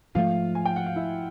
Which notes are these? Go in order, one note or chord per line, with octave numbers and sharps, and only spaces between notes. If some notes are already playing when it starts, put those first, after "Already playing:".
G#2 F3 A3 F4 F5
G#5
G5
F#5
F5
E4 E5